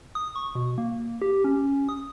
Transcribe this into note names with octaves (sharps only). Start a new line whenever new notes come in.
D#6
C#6
B2
A#3
G4
C#4
D#6